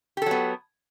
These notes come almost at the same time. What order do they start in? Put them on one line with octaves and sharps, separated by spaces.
G4 A4 F#3 B3